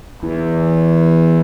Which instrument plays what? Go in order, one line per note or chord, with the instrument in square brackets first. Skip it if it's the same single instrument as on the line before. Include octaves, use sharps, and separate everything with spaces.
[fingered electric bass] E2 [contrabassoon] E3